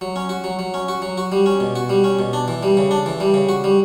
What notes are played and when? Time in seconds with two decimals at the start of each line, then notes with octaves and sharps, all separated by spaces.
0.01 F#3
0.16 C#4
0.29 F#4
0.44 F#3
0.59 F#3
0.74 C#4
0.88 F#4
1.02 F#3
1.18 F#4
1.32 G3
1.46 C#4
1.60 B2
1.75 F#4
1.89 G3
2.04 C#4
2.19 B2
2.33 D4
2.48 E3
2.63 G3
2.77 C#3
2.91 D4
3.06 E3
3.20 G3
3.34 C#3
3.49 F#4
3.64 G3